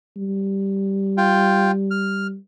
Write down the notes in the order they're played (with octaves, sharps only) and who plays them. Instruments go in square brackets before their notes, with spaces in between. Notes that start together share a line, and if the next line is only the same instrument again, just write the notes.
[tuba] G3
[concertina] F4 G5
F6